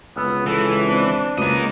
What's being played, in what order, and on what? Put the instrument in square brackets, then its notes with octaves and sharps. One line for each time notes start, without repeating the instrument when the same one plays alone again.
[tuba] C#2 [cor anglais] B3 [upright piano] E6
[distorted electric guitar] E3 [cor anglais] A4
[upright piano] C4 [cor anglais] D4
[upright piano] C#2 [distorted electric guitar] A#3 D#5 [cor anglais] B4